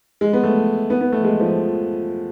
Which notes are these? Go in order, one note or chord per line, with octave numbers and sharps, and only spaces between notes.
G#3
B3
A3
B3
B3
A3
G#3
F3